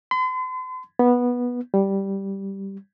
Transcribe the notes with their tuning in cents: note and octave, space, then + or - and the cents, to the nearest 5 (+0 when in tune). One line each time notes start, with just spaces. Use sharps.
C6 -45
B3 -15
G3 -5